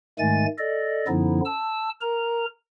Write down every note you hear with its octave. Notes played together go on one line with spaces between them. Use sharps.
G#2 D#3 G#3 A3 G#5 A6
A4 D5 D#5
F#2 D3 F3 B3 D#4 E4
A5 E6
A#4 A#5